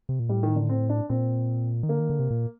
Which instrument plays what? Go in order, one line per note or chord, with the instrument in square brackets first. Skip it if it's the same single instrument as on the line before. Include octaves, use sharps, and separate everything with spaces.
[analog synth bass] C3
A#2
[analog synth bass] A2 [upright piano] G3
[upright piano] D#3
D3
C4
D4
[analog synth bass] A#2 [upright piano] C4
[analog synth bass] D#3
[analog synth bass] D3 [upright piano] A#3
[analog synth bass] D#3
D3
C3
A#2